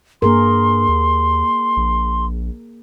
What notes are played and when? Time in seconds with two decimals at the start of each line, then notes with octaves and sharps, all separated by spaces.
0.22 G2 A#3 G#4 A#4 C6
0.88 D#2
1.77 A#1